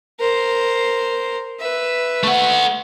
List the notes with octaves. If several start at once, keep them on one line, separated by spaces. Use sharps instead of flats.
A#4 C5
B4 E5
A3 F#5